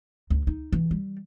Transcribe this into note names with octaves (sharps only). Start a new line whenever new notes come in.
D2
D#4
E3
G3